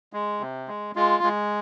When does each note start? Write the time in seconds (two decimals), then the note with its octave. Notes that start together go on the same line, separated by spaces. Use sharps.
0.13 G#3
0.41 C3
0.68 G#3
0.95 G#3 F4
1.23 G#3